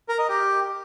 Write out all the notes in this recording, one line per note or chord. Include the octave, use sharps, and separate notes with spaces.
A#4
D#5
G4